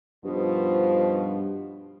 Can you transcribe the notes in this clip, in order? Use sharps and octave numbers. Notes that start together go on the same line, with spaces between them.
G2 B2 D#3 F3